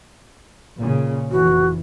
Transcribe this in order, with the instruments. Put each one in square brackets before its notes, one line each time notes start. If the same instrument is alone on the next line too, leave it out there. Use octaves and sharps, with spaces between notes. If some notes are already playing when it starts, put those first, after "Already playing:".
[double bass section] A#2 C#3
[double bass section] F1 E3 [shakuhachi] F#4